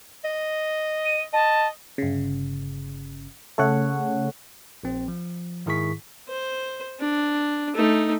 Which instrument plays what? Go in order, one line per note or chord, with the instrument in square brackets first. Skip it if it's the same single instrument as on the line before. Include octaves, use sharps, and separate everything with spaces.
[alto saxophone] D#5
[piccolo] D#7
[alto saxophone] D#5 [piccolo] A5
[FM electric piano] G1 C#3
[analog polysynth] C#3 A3 [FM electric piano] A4 C#5 F#5
[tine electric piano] A#1 C4
F3
G#2 D#3 E4 G#4 C#6 B6
[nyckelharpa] C5
D4
A3 D#4